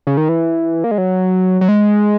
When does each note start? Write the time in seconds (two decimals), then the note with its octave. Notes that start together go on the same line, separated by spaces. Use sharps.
0.07 C#3
0.17 D#3
0.29 E3
0.84 A#3
0.91 G#3
0.98 F#3
1.61 F#3
1.69 G#3